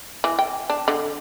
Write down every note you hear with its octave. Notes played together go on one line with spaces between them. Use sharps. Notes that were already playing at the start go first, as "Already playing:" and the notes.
E3
G5
D4
D3